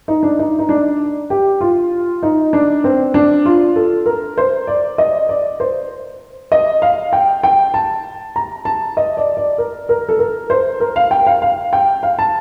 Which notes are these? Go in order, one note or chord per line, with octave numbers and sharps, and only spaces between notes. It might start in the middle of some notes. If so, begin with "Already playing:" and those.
D#4
D4
D#4
D#4
D4
G4
F4
D#4
D4
C4
D4
F4
A4
A#4
C5
D5
D#5
D5
C5
D#5
F5
G5
G5
A5
A#5
A5
D#5
D5
D5
A#4
A#4
A4
A#4
C5
A#4
F5
G5
F5
F5
G5
F5
A5